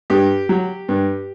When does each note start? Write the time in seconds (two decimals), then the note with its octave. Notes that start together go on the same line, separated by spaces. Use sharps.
0.10 G2 G4
0.49 F#3
0.89 G2